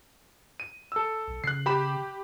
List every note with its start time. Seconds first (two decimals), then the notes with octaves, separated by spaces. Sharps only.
0.60 D#7
0.92 A4 E6
1.28 B1
1.44 C#3 F#6 C7
1.66 G4 B5 E7